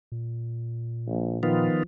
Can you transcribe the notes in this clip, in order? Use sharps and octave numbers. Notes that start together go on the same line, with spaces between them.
A#2
A#1
D#3 F3 B3 F4